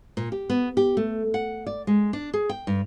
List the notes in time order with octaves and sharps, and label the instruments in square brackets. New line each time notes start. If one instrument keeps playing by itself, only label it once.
[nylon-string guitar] A#2
G4
B3
G4
A3
F#5
D5
G#3
D4
G#4
G5
G2